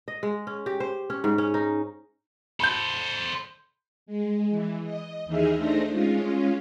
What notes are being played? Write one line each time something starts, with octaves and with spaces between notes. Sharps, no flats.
D#5
G#3
C#4
G4
C5
C#4
G#2
C#4
D#4
A4 C5 B5 G6
G#3
E3
D#5
D#2 E3 D#4 G#4 E5 F6
A3 D4 D#4 C5 A#6
G#3 C#4 F4